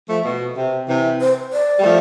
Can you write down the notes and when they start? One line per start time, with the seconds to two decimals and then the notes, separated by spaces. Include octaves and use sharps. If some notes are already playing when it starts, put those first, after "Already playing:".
0.09 F3 A3
0.25 B2
0.57 C3
0.89 C3 E3
1.21 C5
1.53 D5
1.79 G3
1.84 F3 A3